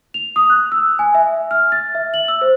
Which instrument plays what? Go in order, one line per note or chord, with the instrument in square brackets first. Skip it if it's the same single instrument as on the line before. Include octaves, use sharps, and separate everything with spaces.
[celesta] F7
D#6
F#6
E6
G#5
E5
F6
A6
E5
F#7
E6
C5